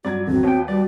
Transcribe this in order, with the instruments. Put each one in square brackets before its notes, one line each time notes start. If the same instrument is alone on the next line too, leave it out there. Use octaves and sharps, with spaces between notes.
[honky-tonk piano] G2 F#3 G#6 [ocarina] F#4 [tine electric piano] D5
[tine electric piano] G#1 E2 D3 [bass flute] C4 [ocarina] F#4
[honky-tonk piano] D#2 B3 [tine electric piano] C#5 G5
[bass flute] G3 [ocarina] F#4 [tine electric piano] D5